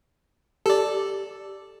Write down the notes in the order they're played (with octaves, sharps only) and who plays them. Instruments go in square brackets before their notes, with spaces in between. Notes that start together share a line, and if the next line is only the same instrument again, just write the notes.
[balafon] G4 [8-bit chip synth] A4 D5